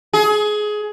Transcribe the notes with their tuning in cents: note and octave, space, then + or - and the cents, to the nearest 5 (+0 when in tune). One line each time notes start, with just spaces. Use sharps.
G#4 +20